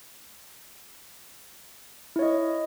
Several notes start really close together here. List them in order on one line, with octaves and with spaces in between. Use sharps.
E4 C#5 D#5